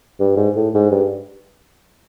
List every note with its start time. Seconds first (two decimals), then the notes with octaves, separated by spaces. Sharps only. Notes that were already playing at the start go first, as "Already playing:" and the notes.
0.20 G2
0.37 G#2
0.56 A2
0.74 G#2
0.92 G2